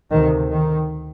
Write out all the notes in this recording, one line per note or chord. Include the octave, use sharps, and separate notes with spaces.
D2 C3 D#3
D#3